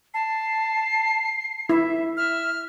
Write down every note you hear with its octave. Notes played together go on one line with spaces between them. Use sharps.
A5 C7
E4 E5
E5 F6